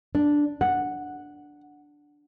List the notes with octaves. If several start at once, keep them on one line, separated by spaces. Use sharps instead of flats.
D4
F#5